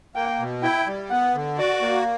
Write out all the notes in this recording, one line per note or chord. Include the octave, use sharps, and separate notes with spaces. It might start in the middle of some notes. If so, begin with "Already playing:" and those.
A#3 G5
B2
E4 G5
G3
B3 F#5
D3
F#4 D5
A#3